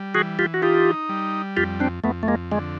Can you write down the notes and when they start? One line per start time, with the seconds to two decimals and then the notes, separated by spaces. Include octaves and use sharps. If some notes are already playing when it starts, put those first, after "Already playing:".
Already playing: G3
0.15 E3 F#4 G#4
0.39 F4 G4
0.54 F#4
0.62 D#4 F4 G4
1.09 G3
1.57 F2 F4 G4
1.80 C4 D4
2.04 F2 A3 B3
2.23 A3
2.28 G#3 A#3
2.51 D3 G#3